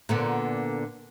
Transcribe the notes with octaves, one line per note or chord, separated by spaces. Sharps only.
A#2 D3 B3